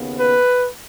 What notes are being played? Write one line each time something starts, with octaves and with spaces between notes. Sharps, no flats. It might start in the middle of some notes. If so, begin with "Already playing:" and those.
Already playing: D#2 C#3 B3
B4